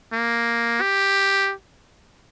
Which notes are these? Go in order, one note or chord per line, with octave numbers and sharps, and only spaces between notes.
A#3
G4